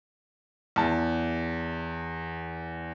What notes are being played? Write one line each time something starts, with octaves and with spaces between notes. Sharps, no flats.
E2 A5